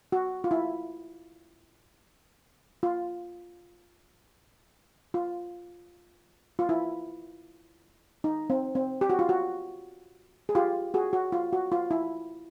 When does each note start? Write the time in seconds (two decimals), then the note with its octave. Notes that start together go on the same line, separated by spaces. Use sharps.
0.12 F#4
0.44 F4
0.51 E4
2.83 F4
5.14 F4
6.59 F4
6.69 E4
8.24 D#4
8.50 C4
8.75 C4
9.01 G4
9.10 F#4
9.19 F4
9.29 F#4
10.49 G#4
10.55 F4 G4
10.94 F#4 G#4
11.13 F#4
11.32 F4
11.53 F#4
11.72 F4
11.91 E4